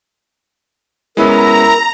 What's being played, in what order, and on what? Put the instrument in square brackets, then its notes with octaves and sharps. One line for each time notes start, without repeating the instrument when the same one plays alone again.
[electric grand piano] G#3 B3 C#4 [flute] E4 [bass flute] A#4 [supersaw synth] A#5